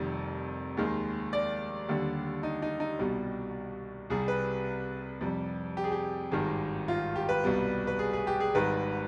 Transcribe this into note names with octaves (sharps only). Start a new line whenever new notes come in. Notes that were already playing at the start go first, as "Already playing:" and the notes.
Already playing: F1 F2 C3 D#3 G3
D#2 D#3 G#3
D5
D#2 D3 G3
D#4
D#4
D#4
C2 B2 G3
C2 C3 G3 G#4
B4
F2 C3 G3
G4
G#4
G4
G#1 G2 D#3 G#3
F4
G4
B4
C2 B2 G3
B4
G#4
G#4
G4
G#4
G#1 G#2 D#3 G3 B4